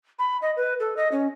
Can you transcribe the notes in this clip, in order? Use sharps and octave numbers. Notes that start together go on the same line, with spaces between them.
B5
D#5
B4
A4
D#5
C#4